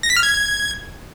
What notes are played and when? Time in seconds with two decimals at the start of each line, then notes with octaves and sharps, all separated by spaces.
0.03 A#6
0.10 B6
0.16 F6
0.23 G#6